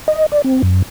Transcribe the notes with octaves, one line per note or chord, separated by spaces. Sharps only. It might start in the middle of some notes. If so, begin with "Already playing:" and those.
D#5
D5
C4
F#2